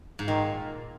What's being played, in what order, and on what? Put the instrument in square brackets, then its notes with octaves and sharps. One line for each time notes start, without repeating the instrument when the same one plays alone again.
[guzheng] G#2
[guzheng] A#2 [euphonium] D#3